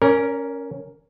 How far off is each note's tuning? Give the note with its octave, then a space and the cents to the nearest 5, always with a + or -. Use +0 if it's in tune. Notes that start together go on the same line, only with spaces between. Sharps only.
C#4 +0 A#4 +0 D5 -40